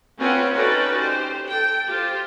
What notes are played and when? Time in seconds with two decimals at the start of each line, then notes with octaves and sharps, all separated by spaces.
0.18 C4 C#4 F4 B4 F#5
0.53 C#4 D#4 F#4 A4 B4 D5
0.95 G4 C5
1.47 A4 G5
1.88 F4 G4 C5